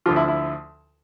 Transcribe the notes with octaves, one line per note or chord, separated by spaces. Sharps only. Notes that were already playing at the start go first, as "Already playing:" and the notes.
D2 D3 F3 F4
E4
E4